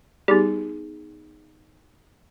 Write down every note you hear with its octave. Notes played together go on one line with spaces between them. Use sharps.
G3 B3 D#4 G#4